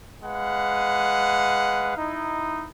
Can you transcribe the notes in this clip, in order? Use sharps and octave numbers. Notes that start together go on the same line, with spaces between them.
G#3 B4 F5 F#5
D#4 E4